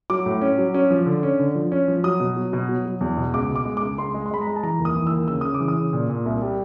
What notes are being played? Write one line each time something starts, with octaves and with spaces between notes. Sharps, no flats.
F#3 D6
A2
C#4
F#3
C#4
F3
D3
C#4
D3
F3
C#4
F3
F#3 D#6
B2
F#3
B2
F#3
F#3
E2
B2
C#2 D6
B2
D6
G#3
C#2 D6
C#2 C6
G#3
C6
G#3 B5
A#5
G#3
A5
E3 A#5
D#2
D#6
E3
D#2 E6
C#3 E6
C#3 D#6
D6
E3
D#6
C#3
A#2
A#2
C2
G3